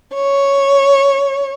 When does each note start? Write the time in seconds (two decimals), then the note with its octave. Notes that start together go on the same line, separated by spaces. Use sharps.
0.14 C#5